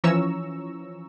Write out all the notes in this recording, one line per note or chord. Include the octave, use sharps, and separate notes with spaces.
E3 F3 C#4 A#5 C#6 E6